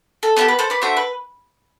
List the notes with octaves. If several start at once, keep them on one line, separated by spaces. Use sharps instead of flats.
A4
B3 E4 G4 A4
B4
A4 C5
B4 D5
A3 D4 F#4 C5 E5
B4